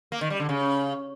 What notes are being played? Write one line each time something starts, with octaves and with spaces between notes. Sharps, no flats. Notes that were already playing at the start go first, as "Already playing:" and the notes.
A#3
D#3
G3
D3
C#3